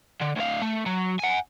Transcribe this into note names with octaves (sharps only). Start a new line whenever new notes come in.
D3
D2 F5
A3
F#3
F#5 G#5